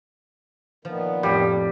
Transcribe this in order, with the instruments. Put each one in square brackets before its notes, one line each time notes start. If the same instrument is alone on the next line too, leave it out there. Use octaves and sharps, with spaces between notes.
[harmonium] A#2 D#3 B3 [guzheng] F3
[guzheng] F2 A2 F5 [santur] G3